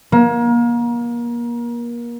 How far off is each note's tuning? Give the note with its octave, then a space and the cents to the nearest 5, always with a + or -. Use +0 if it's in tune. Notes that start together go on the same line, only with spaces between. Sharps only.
A#3 +30